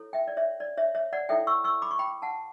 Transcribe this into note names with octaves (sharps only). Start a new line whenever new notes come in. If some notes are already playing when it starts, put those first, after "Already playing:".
Already playing: E4 A4 C#5
E5 G5
D5
C#5 E5
D5
C#5 E5
C#5 E5
D5 F#5
E4 A4 C#5 E5 G5
C#6 E6
C#6 E6
B5 D6
C#6
G5 B5
F#5 A5